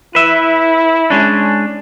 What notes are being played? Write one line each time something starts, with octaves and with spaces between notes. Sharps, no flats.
E4 B4 E5
G#3 C#4 D4